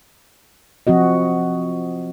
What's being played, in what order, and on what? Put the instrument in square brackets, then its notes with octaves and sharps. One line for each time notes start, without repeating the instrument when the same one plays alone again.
[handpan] F3 C4 F#4 D#5